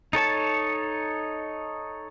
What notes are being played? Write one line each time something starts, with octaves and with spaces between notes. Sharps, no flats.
D#4 A4 C#5 A5